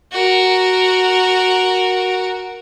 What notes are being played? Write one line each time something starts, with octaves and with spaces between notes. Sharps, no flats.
F#4 A#4